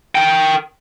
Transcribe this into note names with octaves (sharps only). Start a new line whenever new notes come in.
A#4 G5